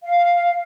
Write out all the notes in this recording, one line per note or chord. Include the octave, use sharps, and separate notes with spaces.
F5